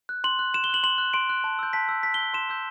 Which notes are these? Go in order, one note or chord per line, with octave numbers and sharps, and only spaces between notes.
F#6
C6 F#7
F#6
C6 E7
G7
F#6 F#7
C6 F#7
F#6
C6 D7
F#6
A5
E6 G6
A5 B6
E6 G6
C6 B6
G7
E6 G6
C6 E7
E6 G6